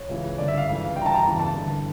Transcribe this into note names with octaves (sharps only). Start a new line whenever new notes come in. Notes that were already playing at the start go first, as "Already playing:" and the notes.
Already playing: C#5
C#2 C#3 E3
G2 D3 D5
E5
F5
C#2 C#3 E3
G2 G5
E3 A5 A#5
A#5
E2 C#3 E3
A5
G2 D3